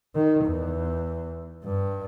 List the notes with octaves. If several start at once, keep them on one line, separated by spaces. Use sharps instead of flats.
D#3
E2
G2